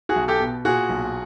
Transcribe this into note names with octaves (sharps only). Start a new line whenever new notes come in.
F#4 G#4
B1
G4 A4
B2
A#2 F#4 G#4
B1